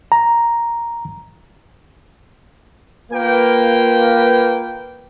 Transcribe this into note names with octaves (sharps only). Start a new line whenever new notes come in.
A#5
A#3 F4 B4 G5